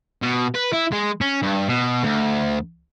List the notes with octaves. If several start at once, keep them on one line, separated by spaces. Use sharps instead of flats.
B2
B4
E4
G#3
C#4
G2
B2
D2